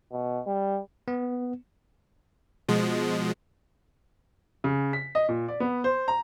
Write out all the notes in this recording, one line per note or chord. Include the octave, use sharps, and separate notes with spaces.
B2
G3
B3
B2 F3 G#3
C#3
B6
D#5
A#2
D5
B3
C5
A#5